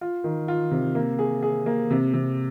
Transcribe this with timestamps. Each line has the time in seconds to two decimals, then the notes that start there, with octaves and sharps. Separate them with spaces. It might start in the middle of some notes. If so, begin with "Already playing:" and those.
0.01 F4
0.24 D#3
0.48 F4
0.71 C3
0.95 A#3
1.19 G#4
1.43 G#4
1.66 A#3
1.90 C3
2.14 C3